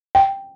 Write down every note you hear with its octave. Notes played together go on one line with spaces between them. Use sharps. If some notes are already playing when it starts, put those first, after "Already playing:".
G5